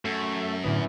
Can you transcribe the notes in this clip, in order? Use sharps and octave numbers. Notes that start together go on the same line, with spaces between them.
F#2 A3
A2 D3 F#3 B3 E4